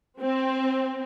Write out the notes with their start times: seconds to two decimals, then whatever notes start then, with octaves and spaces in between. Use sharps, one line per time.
0.20 C4